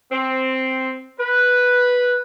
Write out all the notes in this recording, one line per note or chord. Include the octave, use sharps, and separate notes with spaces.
C4
B4